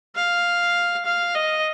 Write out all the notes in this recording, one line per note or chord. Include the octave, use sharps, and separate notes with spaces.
F5
F5
D#5